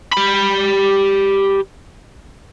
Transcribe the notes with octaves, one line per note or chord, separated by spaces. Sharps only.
G4 B5